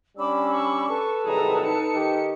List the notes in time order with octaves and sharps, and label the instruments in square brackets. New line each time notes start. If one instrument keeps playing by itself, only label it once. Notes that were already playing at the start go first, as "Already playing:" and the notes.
[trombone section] G3 C#4 D4 [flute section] B5 D6 E6
[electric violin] C#6
[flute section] A4 B4 A5
[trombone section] C2 D#3 F#3 [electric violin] G#4 A#5
[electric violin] D#4 C#7
[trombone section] D#3 G4